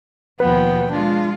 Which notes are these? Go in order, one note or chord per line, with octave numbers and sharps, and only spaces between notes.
D#2 B2 F3 B3 B4 G5
G#3 D4 F4